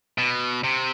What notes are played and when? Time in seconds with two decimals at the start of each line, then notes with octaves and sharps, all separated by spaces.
0.18 B2
0.64 C3